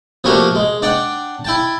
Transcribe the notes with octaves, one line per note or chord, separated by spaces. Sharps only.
F3 A3 A#3 D4 F#4 G4
G#3
D4 D5 F#5 G5
E4 G5 A5